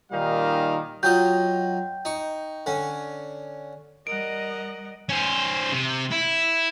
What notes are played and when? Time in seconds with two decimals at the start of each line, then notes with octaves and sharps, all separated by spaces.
0.12 A#2 D#3 G3 D#4 F5
1.03 F#3 F4 D#5 G5 G6
2.05 D#4 C#6
2.66 D3 C#4
4.07 G3 A#4 D#5 F#5 D7
5.09 C#4 C5
5.72 C3
6.12 E4